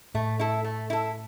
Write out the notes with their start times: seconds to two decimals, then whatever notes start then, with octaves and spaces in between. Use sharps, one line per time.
0.14 A2 A3
0.39 E4 A4
0.64 A3
0.90 E4 A4